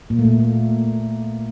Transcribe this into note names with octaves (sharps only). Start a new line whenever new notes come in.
A#2 A#3
A3
A#2 A#3
A3